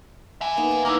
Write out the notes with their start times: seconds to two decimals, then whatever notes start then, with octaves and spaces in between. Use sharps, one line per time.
0.41 E5 G#5
0.57 A#3 B3 D#4
0.71 A5
0.85 A#3 D#4 E4 B4 D#5